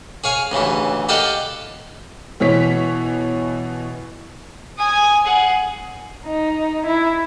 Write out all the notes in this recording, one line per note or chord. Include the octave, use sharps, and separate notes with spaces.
G#4 C#5 F5 G#5
A1 D2 C#3 E3
G4 A4 D5 D#5 F5 F#5
B2 E3 C#5 B6
G#5 D#6
G#4 F#5
D#4
E4